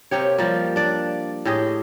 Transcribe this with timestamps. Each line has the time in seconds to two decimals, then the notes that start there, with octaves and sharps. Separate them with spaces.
0.11 C3 A#3 G4 C#5
0.38 F3 G3 A#3
0.76 D4 D5
1.45 A2 G4 G#4 D#5